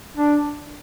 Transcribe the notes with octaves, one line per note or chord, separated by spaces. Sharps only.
D4